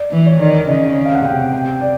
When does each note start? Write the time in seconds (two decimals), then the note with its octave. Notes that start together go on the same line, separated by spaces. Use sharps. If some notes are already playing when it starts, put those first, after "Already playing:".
Already playing: D5
0.11 E3
0.26 C#5
0.39 D#3 D5
0.68 C#3 D#5
1.06 F5
1.15 F#5
1.25 C3 G5
1.53 G5
1.81 D5